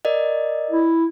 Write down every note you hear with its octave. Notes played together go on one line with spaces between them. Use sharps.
A#4 D5 D#5
E4